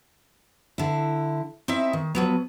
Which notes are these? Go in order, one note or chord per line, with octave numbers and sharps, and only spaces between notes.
D3 E4
C4 D#4 E4 E5
D#3
F3 F#3 B3